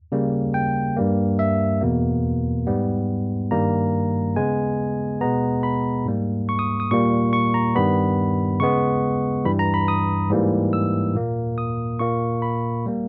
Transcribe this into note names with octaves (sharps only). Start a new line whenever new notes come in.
C#3 G3 A#3
G5
G2 G3 A#3
E5
E2 B2 A#3
G#2 G3 B3
G2 D#3 G3 A#3 A#5
C#3 G#3 B3 G#5
B2 G#3 B3 A#5
B5
G#2 G3 A#3
C#6
D#6
D#6
A#2 G3 A#3 C#6
C#6
A#5
G2 D#3 G3 B3 B5
C#3 G#3 B3 C#6
G2 E3 G3 B5
A#5
B5
D#6
G#2 E3 G3 A#3
E6
A#2 A#3
D#6
A#2 A#3 C#6
B5
G3 A#3